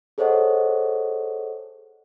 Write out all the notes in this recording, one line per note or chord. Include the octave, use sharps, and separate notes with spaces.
G#4 A4 C5 C#5 D#5 F#5